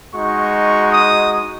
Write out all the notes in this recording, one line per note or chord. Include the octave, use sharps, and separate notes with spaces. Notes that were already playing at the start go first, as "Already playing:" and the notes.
G#3 D#4 F#4 C#6
D#6